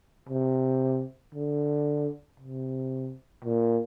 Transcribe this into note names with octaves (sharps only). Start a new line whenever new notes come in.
C3
D3
C3
A#2